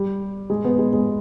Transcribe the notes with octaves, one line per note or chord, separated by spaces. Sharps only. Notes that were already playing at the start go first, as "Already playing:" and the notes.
Already playing: G3
G#3
B3
G#3
G#3